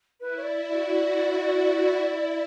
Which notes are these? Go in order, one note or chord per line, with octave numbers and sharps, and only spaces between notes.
E4 B4
C#5
D5
F#4 D5
D5
E4
F#4
E4